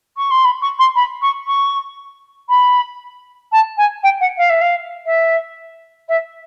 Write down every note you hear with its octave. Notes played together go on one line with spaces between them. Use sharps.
C#6
C6
B5
C#6
C6
B5
C#6
C#6
B5
A5
G#5
G5
F#5
F5
E5
F5
E5
E5